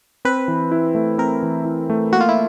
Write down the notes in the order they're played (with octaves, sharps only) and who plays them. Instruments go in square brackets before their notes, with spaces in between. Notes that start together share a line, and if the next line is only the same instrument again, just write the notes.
[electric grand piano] C4 [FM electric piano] B4
[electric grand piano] E3
E4
A3
[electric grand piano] C4 [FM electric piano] A#4
[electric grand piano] E3
E4
A3
[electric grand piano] A#3 [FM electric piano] F#4
[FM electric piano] F4
E4